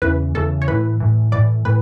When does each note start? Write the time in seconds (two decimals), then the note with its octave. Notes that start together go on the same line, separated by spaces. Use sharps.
0.02 E2 C#3 E3 B4
0.35 E2 C#3 E3 A4
0.62 C#5
0.68 A2 E3 B4
1.00 A2 E3
1.32 A2 E3 D5
1.65 A2 E3 B4